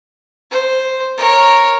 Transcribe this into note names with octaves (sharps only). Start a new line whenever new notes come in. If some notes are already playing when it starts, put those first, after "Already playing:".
C5
A#4 C#5